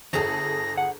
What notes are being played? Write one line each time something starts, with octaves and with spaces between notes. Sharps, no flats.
G1 G#4 A4 A#6
F#5